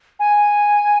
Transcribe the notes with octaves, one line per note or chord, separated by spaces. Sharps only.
G#5